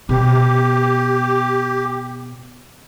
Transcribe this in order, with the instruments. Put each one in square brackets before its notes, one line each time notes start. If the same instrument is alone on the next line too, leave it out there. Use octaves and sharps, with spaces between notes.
[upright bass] B2 [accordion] G4